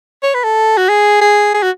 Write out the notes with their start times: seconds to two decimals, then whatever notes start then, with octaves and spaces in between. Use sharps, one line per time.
0.23 C#5
0.34 B4
0.44 A4
0.77 F#4
0.89 G#4
1.21 G#4
1.54 G#4
1.63 F#4